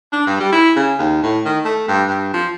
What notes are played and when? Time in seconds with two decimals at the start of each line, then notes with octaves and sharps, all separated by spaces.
0.13 D4
0.27 G2
0.40 G3
0.52 E4
0.76 C#3
0.99 D#2
1.23 A2
1.45 D#3
1.65 A3
1.88 G2
2.08 G2
2.33 F3